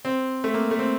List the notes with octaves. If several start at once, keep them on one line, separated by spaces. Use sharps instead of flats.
C4
A3
A#3
A3
C4